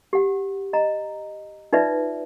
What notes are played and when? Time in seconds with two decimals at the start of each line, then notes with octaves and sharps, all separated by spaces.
0.13 G4 F#5
0.73 D#5 A#5
1.73 D#4 F4 B4 D5 E5